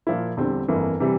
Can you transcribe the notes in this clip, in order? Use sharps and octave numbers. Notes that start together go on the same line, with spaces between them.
A#2 F3 A#3 E4
E2 D3 G3 C4
G1 F2 E3 A#3
C3 E3 G3